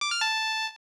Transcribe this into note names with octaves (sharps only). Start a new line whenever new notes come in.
D6
F6
A5